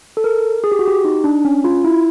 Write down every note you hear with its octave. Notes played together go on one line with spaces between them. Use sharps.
A4
A#4
G#4
G4
F#4
G4
D#4
D4
C#4
F4
E4